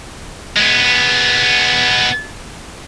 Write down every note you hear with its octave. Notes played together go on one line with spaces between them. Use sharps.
G#3 B3